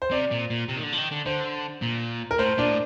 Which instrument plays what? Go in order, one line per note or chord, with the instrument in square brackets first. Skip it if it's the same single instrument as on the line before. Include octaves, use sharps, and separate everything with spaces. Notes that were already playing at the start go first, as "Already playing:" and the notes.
[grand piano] C5
[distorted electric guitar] C3 [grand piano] D5
[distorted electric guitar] A#2
A#2
C3
D#3
D3
F3
D#3
D3
[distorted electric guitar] D3 [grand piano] C5
[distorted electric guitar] A#2
[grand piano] A#4
[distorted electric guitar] A2 [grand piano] C5
[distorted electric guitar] A#2 [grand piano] D4
[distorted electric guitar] A2